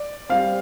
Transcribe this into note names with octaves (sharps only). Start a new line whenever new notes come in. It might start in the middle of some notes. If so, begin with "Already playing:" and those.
Already playing: D5
G3 C4 F5